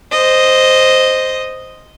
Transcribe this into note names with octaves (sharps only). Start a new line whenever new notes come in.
C5 D#5